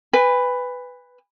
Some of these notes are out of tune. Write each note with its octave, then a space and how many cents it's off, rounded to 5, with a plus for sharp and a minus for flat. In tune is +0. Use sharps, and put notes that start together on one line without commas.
B4 +10 G#5 -35